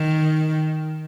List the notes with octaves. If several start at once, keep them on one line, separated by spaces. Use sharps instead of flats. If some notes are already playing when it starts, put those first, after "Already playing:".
Already playing: D#3